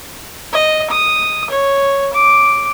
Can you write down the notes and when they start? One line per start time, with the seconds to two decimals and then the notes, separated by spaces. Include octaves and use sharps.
0.53 D#5
0.91 D#6
1.51 C#5
2.14 D6